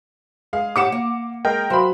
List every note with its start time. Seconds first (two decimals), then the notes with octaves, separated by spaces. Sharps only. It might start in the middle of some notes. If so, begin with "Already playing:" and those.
0.53 G#3 G#4 F5
0.76 A2 G4 F#5 D6 C#7 E7
0.92 A#3
1.45 G#3 A#4 D#5 G5
1.70 F#3 C5 F5 B5